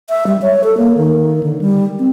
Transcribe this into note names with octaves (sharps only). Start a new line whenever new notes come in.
E5
G3
C#5
A4
A#3
D#3
D3
G3
C4